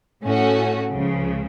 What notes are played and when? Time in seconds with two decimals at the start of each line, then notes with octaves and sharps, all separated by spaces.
0.23 A2 A3 C#4 F#4
0.92 C#2 C#3 F3